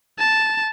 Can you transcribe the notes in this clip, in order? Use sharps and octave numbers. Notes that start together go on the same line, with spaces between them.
A5